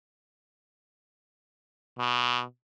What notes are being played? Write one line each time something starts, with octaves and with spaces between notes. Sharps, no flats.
B2